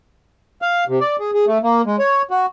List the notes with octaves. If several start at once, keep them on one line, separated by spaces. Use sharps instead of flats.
F5
C3
D5
G#4
G#4
A3
A#3
G#3
C#5
F#4